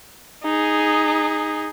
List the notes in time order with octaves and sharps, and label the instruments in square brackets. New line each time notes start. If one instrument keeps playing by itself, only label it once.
[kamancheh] D#4 G#4